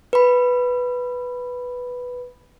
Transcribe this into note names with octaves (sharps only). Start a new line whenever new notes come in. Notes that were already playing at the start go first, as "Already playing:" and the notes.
B4 B5